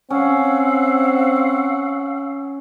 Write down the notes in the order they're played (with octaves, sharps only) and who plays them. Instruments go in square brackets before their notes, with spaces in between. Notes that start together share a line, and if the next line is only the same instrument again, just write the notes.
[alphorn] C4 [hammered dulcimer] C#4 [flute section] F5 F#5 E6